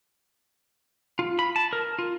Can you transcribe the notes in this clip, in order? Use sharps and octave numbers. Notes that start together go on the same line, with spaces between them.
F4
B5
A5
A#4
F4